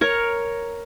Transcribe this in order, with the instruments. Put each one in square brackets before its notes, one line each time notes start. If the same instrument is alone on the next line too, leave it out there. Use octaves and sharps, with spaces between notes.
[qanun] A#4 C#5